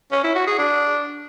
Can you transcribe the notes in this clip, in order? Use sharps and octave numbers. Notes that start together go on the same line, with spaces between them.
C#4
E4
F#4
G#4
D4